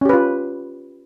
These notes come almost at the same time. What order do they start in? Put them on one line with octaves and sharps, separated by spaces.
C#4 G4 B4 F4